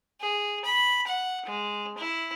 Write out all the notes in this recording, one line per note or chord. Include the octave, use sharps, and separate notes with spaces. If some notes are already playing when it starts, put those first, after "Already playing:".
G#4
B5
F#5
G#3
E4